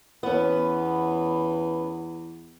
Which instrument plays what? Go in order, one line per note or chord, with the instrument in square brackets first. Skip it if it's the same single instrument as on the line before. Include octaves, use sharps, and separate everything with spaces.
[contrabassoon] E2 [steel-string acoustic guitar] B3 C#4